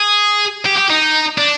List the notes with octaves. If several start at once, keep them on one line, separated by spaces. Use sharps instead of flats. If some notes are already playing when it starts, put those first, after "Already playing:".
Already playing: G#4
G4
G4
D#4
D4